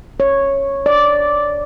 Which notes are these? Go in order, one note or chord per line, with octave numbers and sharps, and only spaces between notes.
C#5
D5